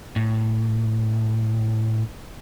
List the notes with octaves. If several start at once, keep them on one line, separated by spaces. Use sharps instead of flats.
A2